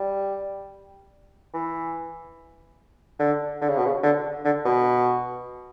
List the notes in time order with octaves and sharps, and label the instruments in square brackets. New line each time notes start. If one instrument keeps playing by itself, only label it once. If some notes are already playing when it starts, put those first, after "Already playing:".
Already playing: [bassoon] G3
E3
D3
D3
C#3
B2
C#3
D3
D3
B2